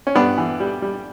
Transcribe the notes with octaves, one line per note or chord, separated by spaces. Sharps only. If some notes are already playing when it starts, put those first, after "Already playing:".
C#4
G2 B3 D4
E3
G3
G3